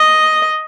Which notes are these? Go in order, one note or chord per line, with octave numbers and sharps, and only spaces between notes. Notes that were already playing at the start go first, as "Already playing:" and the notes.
Already playing: D#5